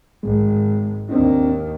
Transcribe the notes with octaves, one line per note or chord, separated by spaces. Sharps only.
G#1 G#3
D#2 D#3 C4 D4 D#4